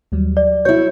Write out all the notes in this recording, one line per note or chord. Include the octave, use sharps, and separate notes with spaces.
D#2 F#3 G3
D5
E4 F#4 C#5 G6